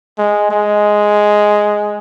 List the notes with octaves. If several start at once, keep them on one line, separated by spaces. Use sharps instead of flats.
G#3
G#3